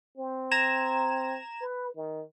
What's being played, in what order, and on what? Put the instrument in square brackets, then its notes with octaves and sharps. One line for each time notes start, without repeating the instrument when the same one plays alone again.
[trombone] C4
[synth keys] A#5 G#6 E7
[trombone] B4
D#3